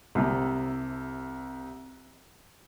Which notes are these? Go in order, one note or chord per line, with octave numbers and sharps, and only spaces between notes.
C2 C3